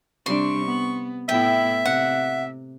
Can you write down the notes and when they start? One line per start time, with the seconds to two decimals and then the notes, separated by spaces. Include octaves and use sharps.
0.26 C3 G3 D4 C6 C#6
0.65 B3
1.29 A2 B3 E4 E5 G5
1.86 C3 F#5